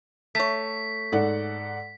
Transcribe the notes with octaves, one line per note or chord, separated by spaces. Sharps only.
A3 C#5 B6
G#2 A4 D5 F#5